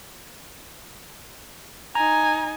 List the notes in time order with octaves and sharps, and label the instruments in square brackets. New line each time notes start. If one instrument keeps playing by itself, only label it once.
[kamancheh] D#4 G#5 [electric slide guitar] A#5